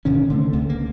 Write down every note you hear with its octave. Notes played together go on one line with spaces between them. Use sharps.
D1 C3 D#3 C#4
D3 A3 C4
C#2 A3
C#3 A#3